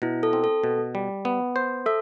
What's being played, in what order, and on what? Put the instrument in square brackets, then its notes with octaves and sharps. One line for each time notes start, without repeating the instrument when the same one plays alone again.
[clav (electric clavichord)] B2 [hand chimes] E4
[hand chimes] A4
[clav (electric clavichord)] C4
[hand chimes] A4
[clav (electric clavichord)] B2
G3
B3
C5
[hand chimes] A4 [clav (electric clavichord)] E5